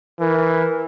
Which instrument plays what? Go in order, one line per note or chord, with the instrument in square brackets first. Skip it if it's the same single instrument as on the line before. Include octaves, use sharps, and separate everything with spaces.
[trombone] E3 [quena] A#4